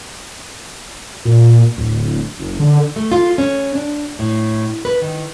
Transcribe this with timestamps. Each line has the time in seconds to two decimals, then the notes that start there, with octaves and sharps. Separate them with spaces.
1.25 A#2
1.77 D1
2.40 F#1
2.60 D3
2.96 A3
3.12 F4
3.38 C#4
3.75 D4
4.19 A2
4.85 B4
5.02 D#3